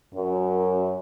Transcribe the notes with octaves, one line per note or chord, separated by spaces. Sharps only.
F#2